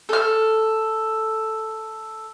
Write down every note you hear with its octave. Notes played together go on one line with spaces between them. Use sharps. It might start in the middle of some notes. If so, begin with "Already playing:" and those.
A4 F6